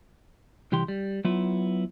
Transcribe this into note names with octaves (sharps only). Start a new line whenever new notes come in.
C2 E3 G4 G5 C6
G3
F#3 B3 E4 F4